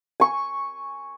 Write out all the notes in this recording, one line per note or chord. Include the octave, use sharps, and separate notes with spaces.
G#5 C#6